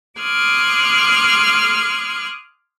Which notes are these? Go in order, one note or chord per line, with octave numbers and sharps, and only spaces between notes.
C6 D6 D#6 F6 F#6 G#6